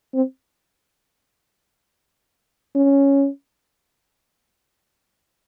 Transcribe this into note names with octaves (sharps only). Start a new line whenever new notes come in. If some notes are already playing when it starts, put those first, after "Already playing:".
C4
C#4